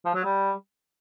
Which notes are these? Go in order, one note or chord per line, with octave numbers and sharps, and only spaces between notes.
F3
F#3
G3